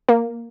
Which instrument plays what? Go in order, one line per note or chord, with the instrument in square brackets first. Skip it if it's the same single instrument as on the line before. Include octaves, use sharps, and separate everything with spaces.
[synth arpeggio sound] A#3